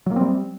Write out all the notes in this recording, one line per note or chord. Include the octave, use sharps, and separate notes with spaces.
F#3 G3 A#3 C4